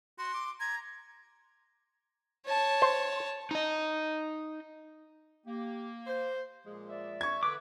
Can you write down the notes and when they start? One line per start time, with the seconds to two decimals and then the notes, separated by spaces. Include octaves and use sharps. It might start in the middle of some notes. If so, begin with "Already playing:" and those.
0.18 F#4 C6
0.34 D6
0.60 A#5 G#6
2.46 C#5 A5
2.82 C5
3.51 D#4 D#5
5.47 A#3 G4
6.07 C5
6.65 A#2 F3 G#3
6.89 D5 E5
7.21 C#6 G#6
7.43 D3 B4 D6